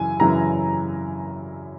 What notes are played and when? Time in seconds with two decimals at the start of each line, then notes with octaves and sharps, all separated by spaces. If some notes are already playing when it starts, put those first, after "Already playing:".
Already playing: F#2 C#3 E3 G#5
0.20 F#2 C#3 E3 A#5